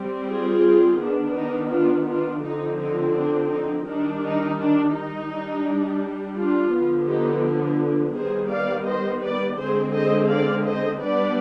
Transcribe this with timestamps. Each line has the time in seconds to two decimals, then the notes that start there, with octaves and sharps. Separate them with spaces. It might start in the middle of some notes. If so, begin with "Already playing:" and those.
Already playing: G3 C4
0.28 F4 G#4
1.00 D#3 B3 D4
1.35 D#4
1.71 D4 F4
2.07 D4 F4
2.42 D3 F3 C4 D#4
2.78 D#4
3.14 D4
3.49 D#4
3.85 D#3 G3 D4 D#4
4.21 D#4
4.57 D4
4.93 D#4
5.29 G3 D4
6.35 D4 F4
6.71 D3 F3 B3 D4
7.06 D#4 G4
8.13 D#3 G3 B3 G#4 C5
8.49 D5 F5
8.85 C5 D#5
9.21 B4 D5
9.57 D3 G#3 C4 G#4 C5
9.93 C5 D#5
10.28 D5 F5
10.64 C5 D#5
11.00 G3 B3 D4 B4 D5